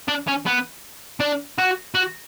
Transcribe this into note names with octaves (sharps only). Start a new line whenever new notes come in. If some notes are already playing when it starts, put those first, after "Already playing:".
D4
C#4
B3
D4
F#4
F#4